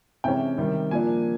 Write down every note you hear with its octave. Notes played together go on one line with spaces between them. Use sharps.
C3 E3 G#3 C#4 G5
C3 D#3 G3
A#2 F3 A#3 D4 G#5